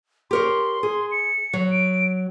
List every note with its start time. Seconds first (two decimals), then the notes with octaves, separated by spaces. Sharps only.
0.31 G4 A#4 C#5 C6
0.83 G#4
1.11 C#7
1.53 F#3
1.71 D7